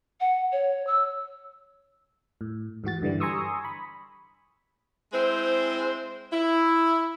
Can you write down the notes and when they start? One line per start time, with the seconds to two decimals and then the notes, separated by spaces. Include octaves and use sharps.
0.20 F#5
0.52 C#5
0.87 E6
2.41 A2
2.84 G#2 E3 F#4 A6
3.02 G2 D3 E3 G3
3.20 G#5 A#5 C6 C#6 D#6 E6
3.65 B5
5.13 G#3 C4 E4 C5
6.33 E4